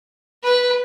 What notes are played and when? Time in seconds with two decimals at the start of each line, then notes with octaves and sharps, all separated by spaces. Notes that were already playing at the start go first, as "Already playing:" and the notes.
0.43 B4